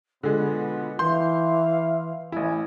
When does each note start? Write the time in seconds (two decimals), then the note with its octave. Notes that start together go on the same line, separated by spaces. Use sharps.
0.23 B2 D3 G#3 B3 F4
0.99 E3 E5 F5 C6 G6
2.32 A1 E4 G#5